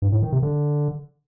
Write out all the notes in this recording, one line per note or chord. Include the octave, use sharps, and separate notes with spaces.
G2
A2
D#3
C3
D3